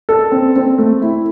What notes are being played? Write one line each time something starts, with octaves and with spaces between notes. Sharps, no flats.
A4
C4
C4
A3
E4